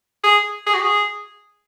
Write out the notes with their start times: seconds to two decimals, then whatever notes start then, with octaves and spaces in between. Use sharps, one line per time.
0.24 G#4
0.67 G#4
0.74 F#4
0.82 G#4